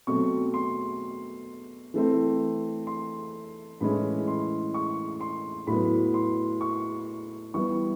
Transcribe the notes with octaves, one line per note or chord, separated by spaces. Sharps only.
B2 F#3 A3 C4 C#6
C6
E3 A3 C4
C6
A2 E3 G#3 C#4 B5
C6
C#6
C6
A2 F#3 B3 B5
C6
C#6
E3 G3 B3 C#6